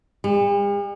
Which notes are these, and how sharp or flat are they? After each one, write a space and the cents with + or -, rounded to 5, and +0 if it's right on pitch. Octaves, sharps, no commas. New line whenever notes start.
G3 +45